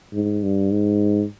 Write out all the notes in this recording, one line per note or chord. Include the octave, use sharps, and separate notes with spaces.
G#2
G2
G#2